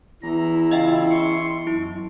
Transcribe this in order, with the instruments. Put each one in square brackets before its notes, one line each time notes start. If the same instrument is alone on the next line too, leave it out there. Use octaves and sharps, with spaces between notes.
[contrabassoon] E2 [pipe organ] E3 A#5 [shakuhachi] E4
[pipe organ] C#3 F4 [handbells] D#5 E5 G5
[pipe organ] C6 C#6
[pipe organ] F#2 [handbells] E4